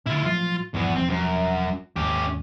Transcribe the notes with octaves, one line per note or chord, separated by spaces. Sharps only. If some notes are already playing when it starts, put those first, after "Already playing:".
A2 D3 E4 F4
A2 F3 F#3 F4
D#1 E2 G2 F3 B3
E1 F3 C4
F#2
D#2 G#2 C#4 G4